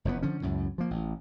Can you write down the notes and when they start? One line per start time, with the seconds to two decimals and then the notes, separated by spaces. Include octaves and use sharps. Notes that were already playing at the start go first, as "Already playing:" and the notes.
0.05 F1 E2 C3 B3
0.22 D3 F3 C#4
0.42 C#2 F#2 A2
0.78 F3 A#3
0.91 A1